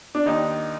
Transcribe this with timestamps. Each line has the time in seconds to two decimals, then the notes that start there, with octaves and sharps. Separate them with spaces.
0.15 D4
0.26 D#2 D#3 D#4